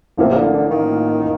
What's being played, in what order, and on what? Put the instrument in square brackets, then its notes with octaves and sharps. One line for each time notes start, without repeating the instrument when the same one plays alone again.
[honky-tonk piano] A1 A2 F3 A#3 [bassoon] C3
[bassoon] C3
D3
D3
D#3